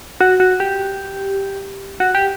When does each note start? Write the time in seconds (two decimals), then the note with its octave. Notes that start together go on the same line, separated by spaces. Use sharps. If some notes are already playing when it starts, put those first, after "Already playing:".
0.21 F#4
0.40 F#4
0.60 G4
2.00 F#4
2.15 G4